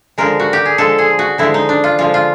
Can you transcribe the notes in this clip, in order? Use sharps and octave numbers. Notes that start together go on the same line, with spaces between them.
D3 F3 G#3 A#4
F#4
G4
G#4
D3 F3 G#3 A4
G#4
F#4
D3 F3 G#3 E4
D#4
D4
F4
D3 F3 G#3 F4
F4